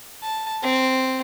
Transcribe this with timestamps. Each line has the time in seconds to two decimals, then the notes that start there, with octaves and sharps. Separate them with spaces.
0.23 A5
0.63 C4